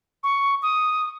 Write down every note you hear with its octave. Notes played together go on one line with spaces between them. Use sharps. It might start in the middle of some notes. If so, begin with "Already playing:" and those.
C#6
D#6